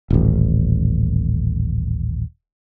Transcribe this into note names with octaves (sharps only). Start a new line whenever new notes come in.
D#1 A1